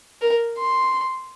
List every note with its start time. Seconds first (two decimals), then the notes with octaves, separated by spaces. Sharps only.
0.21 A#4
0.58 C6